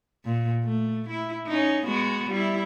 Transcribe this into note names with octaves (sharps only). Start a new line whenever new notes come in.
A#2
A3
E4
C#4 D#4
G#3 B3 F#4
G3 E4